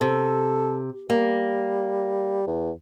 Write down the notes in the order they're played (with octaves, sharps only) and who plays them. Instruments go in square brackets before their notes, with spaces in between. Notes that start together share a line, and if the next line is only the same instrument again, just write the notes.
[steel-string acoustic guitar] C3 [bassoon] A4
[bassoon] G3 [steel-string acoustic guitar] A#3
[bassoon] E2